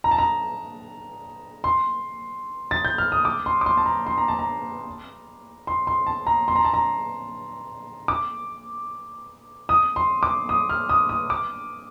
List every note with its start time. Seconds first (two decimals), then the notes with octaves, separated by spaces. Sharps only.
0.04 A#5
0.11 A5
0.18 A#5
1.64 C6
2.71 A6
2.85 G6
2.98 F6
3.12 D#6
3.25 D6
3.46 C6
3.61 D6
3.66 C6
3.77 A5
3.86 A#5
4.06 C6
4.18 A#5
4.28 A5
4.39 A#5
5.67 C6
5.87 C6
6.07 A5
6.27 A#5
6.48 C6
6.56 A#5
6.65 A5
6.74 A#5
8.08 D6
9.69 D#6
9.96 C6
10.23 D6
10.49 D#6
10.69 F6
10.89 D#6
11.09 D#6
11.30 D6